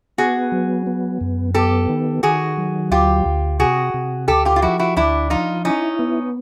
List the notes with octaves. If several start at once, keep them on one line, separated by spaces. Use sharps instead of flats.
B3 F#4 G#4
F#3
B3
F#2
B3 G4 A4
D#3
D#3 F#4 G#4
F#3
D2 F4 G4
D2
C3 F#4 G#4
C3
D2 G4 A4
F4 G4
F4
F3 E4 F#4
E4 F#4
D2 D4 E4
F3 D#4 F4
C#4 D#4 E4
B3